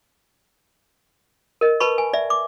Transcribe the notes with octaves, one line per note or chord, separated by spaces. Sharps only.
A#4 D#5
B4 A5 B5 C#6
G#5
D5 E5
D6